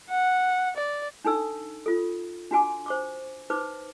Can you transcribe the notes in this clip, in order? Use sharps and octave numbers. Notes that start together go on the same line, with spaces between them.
F#5
D5
D4 D#4 A4 E6
F4 A4
D4 F#4 G#5 D6
C5 C#6 D6
D#4 B4 C5 D6